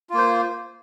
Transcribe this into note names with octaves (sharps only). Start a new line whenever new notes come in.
A#3 F4 C5